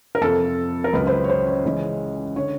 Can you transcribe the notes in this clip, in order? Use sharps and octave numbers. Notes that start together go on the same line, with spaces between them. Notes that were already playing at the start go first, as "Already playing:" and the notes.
A#4
F2 C3 F3 A4
A#4
C#2 C#3 F#3 B4
C5
B4
C#5
C5
C#5
C#2 C#3 E3 G#3
D3 C#5